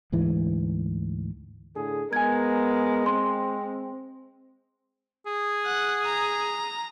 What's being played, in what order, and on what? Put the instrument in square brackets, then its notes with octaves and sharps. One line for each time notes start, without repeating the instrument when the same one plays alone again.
[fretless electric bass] D2 G#2 E3
[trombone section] A2 D3 G#4
[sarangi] G#3 [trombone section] B3 A#4 [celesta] G#5 G#6
[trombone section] C4 [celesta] C6
[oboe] G#4
[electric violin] F#5
A#5